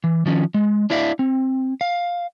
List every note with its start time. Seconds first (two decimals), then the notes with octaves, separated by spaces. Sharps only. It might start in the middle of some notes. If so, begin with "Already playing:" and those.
0.04 E3
0.26 D#3 F3 C#4
0.54 G#3
0.90 D4 E4 D5 E5 F5
1.19 C4
1.81 F5